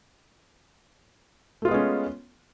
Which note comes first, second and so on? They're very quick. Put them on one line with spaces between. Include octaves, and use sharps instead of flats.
A3 F4 B3 G#3 C#4